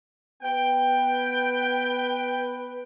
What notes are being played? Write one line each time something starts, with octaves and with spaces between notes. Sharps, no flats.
B3 B4 G5